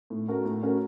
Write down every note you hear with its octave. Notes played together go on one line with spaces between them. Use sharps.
A2
A3 C#4 F#4 A#4
A2
A3 C#4 F#4 A#4